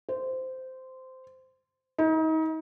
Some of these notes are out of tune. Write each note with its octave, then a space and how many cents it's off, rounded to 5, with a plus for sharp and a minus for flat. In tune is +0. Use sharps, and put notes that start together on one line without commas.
C5 -15
D#4 +35